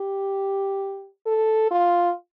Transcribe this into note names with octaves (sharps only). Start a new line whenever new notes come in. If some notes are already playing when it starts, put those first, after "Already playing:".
Already playing: G4
A4
F4